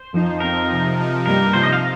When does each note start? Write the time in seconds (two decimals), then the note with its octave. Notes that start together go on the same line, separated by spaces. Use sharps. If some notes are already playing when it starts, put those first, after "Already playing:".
Already playing: C5
0.13 F2 F3 D#4
0.40 F2 F3 C4 D#4 A#4
0.69 C3 F3 D#4
0.97 C3 F3 D#4
1.25 G2 G3 A#3 D#4 A#4
1.54 C3 F3 D#4 C5
1.64 D#5
1.73 F5